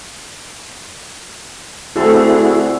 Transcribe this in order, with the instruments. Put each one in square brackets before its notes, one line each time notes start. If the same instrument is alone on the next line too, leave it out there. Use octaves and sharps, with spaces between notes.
[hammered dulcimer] D3 A4 [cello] A3 C4 [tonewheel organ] E4 F#4 G#4